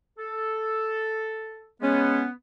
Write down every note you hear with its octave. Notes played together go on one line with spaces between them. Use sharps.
A4
G#3 B3 C#4